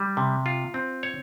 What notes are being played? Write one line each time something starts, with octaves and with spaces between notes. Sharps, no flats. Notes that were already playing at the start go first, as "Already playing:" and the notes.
Already playing: G3
C3
F4
C4
C#5